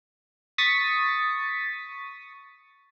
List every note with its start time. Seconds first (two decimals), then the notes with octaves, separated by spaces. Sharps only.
0.58 C#6 D#6 A6 B6 C#7